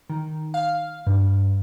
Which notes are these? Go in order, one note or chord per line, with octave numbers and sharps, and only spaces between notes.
D#3
F5
G2